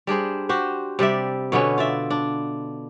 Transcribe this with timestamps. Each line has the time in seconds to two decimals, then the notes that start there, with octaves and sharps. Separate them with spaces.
0.07 G3 D4 G#4 C5
0.49 F#4 G4 C5
0.99 C3 G3 D5 E5
1.52 B2 D3 B3 C#4
1.78 F4 D5 E5
2.10 D4